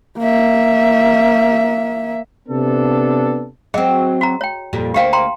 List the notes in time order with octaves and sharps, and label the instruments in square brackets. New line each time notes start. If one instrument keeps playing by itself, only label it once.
[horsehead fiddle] A#3 E5
[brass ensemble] C3 B3 D4 A4
[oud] F#3 C4 [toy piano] G#4 D#5
[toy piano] F#4 A#5
C#5 G5
[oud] F2 A#2 G3
[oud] D2 A#3 C5 [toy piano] G4 F5 G5
[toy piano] G5 A#5 C6